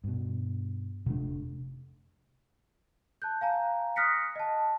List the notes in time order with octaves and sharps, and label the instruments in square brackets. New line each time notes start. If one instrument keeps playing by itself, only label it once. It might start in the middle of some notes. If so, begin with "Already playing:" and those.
[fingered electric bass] G2 B2
[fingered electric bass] F1 A3 [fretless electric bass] C3 D4
[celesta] A5 F#6 G6
F5 G#5 A#5
D#6 F6 F#6 A#6 B6 C#7
D#5 A5